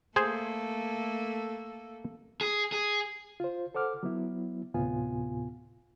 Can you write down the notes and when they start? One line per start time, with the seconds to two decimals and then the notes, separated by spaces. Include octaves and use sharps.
0.16 A3 A#3 G#4 A4 C5
2.41 G#4
2.72 G#4
3.40 F4 C5
3.75 A4 C5 F#5 D6 F6
4.03 F#3 B3 E4
4.74 D2 A2 C3 B3 F4 G#5